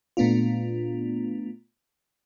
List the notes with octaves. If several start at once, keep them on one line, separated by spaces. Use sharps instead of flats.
A#2 A3 B3 D4 F4